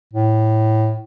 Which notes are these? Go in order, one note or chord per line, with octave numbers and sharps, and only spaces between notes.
A2